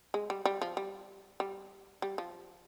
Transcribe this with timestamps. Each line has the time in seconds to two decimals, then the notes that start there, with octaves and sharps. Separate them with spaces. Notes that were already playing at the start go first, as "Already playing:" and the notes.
0.14 G#3
0.30 G3
0.45 G3
0.62 F3
0.77 G3
1.40 G3
2.02 G3
2.18 F3